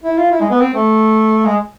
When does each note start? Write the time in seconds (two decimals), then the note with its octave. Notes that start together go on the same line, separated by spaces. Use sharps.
0.04 E4
0.18 F4
0.32 E4
0.41 G#3
0.50 B3
0.60 C4
0.74 A3
1.45 G#3